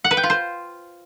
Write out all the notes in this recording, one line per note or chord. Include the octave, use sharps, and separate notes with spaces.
F#5
B4
G5
F4
C5